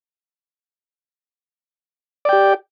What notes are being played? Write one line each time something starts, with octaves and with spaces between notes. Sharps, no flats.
G4 D5 G5